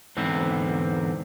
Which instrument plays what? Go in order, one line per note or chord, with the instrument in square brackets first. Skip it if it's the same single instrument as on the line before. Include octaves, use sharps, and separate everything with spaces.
[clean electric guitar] E2 G#2 D3 C4